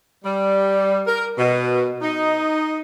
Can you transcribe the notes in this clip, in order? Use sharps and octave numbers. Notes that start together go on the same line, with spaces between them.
G3
A#4
B2
D#4